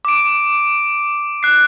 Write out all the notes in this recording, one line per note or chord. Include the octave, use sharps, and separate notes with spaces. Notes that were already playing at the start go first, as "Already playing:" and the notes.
D6 D7
F#6 C7